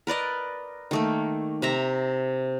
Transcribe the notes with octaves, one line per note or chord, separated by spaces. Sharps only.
A#4 B4 D5 D#5
D#3 A3 A#3
C3 E5 A#5